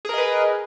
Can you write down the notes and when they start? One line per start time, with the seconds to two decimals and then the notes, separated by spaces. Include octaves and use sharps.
0.05 G#4
0.09 A#4
0.14 D#5
0.18 B4